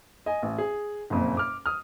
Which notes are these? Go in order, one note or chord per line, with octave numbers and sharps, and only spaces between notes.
D#5 G#5
A1
G#4
F#1 F2 A#2
D6 F6
D#6 F6